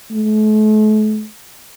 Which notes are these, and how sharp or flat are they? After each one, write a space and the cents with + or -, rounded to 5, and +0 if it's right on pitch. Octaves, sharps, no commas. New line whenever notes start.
A3 -40